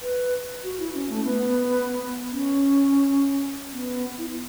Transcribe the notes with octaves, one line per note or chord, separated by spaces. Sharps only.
B4
F#4
E4
C#4
A3
B3
C#4
B3
E4
E4